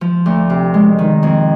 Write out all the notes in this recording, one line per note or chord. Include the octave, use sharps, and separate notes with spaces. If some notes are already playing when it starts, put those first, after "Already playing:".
F3
D2
C3
G#3
D#3
F2